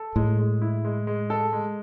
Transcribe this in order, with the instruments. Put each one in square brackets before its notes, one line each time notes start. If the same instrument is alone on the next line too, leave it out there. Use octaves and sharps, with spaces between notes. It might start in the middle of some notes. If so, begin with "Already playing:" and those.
Already playing: [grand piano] A4
[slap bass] A2 [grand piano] G#3
[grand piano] G#3
E4
G#3
G#3
A4
G#3